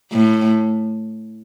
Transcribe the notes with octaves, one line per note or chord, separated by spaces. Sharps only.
A2